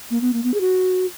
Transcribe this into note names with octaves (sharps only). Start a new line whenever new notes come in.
A#3
B3
A#3
B3
G#4
F#4